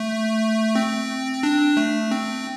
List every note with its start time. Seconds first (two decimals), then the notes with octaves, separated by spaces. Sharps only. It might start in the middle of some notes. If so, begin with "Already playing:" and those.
Already playing: A3
0.75 C4
1.43 D4
1.77 A3
2.11 C4